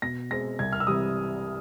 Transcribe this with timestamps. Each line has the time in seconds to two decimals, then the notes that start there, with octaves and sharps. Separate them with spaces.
0.02 B2 A#6
0.31 G#3 C4 A#6
0.59 C2 G#6
0.73 F6
0.80 E6
0.87 C3 E3 G3 D#6